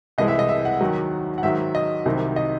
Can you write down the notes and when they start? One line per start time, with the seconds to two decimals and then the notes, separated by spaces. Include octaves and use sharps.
0.18 C2 C3 E3 G#3 D#5
0.28 E5
0.39 D#5
0.49 E5
0.65 F#5
0.81 D#2 D#3 F#3
1.38 F#5
1.43 G#2 D#3 F#3 E5
1.75 D#5
2.06 C2 C3 D#3 F#3
2.36 D#5